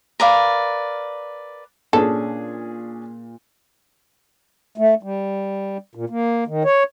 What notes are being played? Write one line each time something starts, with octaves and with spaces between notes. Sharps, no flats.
A#4 B4 D5 F5
A#2 C#4 D4 G#4 A4
A3
G3
A#2
A#3
D#3
C#5